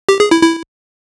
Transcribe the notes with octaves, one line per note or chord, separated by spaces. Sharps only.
G4
G#4
E4
E4